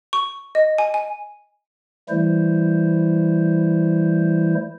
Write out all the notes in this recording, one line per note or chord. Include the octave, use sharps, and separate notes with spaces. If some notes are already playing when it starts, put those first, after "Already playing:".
C#6
D#5
G#5
G#5
E3 G3 A3 E4 C5